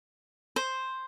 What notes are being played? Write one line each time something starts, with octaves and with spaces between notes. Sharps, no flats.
C5